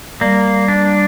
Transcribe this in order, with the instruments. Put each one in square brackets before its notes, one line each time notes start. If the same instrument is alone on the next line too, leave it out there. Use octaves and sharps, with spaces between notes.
[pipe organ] G3 [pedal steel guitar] A#3
[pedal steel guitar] D4